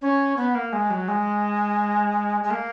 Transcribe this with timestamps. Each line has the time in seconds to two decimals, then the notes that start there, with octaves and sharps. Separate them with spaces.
0.01 C#4
0.37 B3
0.55 A#3
0.73 G#3
0.90 F#3
1.08 G#3
2.43 G#3
2.50 A#3